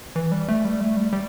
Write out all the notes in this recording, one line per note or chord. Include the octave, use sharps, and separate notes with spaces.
E3
G3
A3
G3
A3
G3
G3